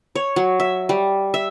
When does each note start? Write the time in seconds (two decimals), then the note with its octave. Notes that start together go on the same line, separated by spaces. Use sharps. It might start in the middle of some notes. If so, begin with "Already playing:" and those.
0.15 C#5
0.36 F#3
0.60 E5
0.89 G3
1.34 E5